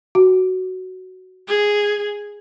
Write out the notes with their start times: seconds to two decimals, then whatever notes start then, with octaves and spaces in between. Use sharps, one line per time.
0.15 F#4
1.48 G#4